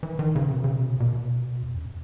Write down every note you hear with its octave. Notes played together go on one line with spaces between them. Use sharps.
E3
D#3
C#3
B2
C#3
B2
B2
E2
F#2